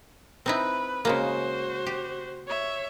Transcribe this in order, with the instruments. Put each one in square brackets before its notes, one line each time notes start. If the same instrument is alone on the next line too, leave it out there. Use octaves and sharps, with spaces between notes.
[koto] C4 D#4 E4 [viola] B4
[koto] C#3 G#3 A#3 [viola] F#4 C5
[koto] G4
[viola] C#5 E5